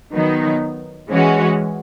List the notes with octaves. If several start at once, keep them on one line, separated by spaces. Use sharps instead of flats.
D#3 F#3 B3 D#4
E3 G#3 C#4 F#4